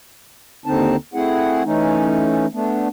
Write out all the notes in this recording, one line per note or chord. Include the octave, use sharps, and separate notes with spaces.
D#2 D3 C4 D#4 A5
A3 C4 E4 G#4 F#5
E3 A3 C#4 D#4
A3 B3 D4